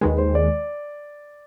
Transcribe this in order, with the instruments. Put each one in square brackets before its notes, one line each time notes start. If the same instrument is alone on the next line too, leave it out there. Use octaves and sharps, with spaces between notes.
[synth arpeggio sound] D#2 D#3 G#3 [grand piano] B4
[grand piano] C5
D5